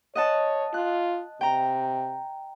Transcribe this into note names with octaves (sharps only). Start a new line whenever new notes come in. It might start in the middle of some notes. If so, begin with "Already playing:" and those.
C#5 D#5 F#5 A5
F4 F#6
C3 G5 A#5